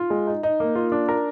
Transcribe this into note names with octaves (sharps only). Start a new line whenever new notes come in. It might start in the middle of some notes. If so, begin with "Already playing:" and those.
Already playing: F4
G#3
D#4
D#4
A#3
F4
D4
A#4